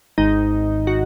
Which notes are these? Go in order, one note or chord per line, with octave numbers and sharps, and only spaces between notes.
G#1 G#2 D#3 D#4
F#4